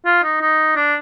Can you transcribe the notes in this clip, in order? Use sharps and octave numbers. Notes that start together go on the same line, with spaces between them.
F4
D#4
D#4
D4